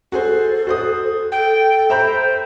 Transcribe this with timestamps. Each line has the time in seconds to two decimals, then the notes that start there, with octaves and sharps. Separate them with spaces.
0.12 F#4 G#4 A4 C5
0.67 F#4 C5 D#6
1.32 A4 G5
1.90 C5 E5 A#5 B5